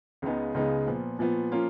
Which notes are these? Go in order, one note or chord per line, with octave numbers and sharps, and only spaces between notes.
C#2 C#3 G#3 B3 D#4
C#2 C#3 G#3 B3 D#4
A#2 F3 B3
A#2 F3 B3
F3 A#3 C#4 F4